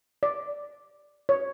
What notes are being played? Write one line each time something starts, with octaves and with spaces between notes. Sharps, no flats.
D5
C#5